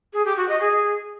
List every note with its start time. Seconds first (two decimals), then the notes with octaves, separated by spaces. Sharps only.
0.13 G#4
0.25 G4
0.37 F#4
0.48 D#5
0.60 G#4